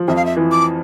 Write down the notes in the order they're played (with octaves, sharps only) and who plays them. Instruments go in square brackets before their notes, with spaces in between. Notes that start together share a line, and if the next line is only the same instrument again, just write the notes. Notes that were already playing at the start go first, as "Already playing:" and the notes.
Already playing: [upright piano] F3
[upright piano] F2 [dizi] E5
[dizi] F5
E5
[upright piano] E3
[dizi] D6